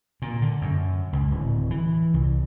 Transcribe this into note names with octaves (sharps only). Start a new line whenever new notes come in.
A#2
D3
F#2
C#2
D1
E3
C2